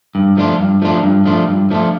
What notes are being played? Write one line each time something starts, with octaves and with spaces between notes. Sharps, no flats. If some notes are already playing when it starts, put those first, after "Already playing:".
G2
F3 A3 D4 F4
G2
F3 A3 D4 F4
G2
F3 A3 D4 F4
G2
F3 A3 D4 F4